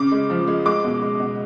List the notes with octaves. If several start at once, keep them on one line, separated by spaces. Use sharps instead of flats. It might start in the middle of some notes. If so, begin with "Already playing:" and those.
Already playing: C#3 D6
G#3
F3
G#3
G#3 D6
B2
G#3
B2